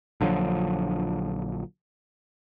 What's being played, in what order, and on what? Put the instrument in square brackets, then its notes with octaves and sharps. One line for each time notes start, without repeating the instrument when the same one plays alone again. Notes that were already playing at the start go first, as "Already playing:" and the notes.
[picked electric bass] A#1 D3 F3 F#3